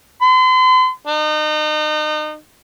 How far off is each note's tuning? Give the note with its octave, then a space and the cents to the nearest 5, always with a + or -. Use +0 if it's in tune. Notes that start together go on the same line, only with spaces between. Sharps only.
C6 -40
D#4 -35